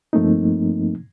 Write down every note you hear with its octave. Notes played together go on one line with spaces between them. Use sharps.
G2 F3 A3 A#3 C4 D#4